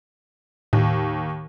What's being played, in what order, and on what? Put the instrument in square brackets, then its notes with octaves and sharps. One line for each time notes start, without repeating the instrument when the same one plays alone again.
[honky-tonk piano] D#2 [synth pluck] A2